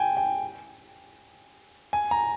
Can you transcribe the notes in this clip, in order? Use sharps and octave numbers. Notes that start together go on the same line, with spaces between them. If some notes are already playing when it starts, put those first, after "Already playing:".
Already playing: G5 G#5
G5
G#5
A#5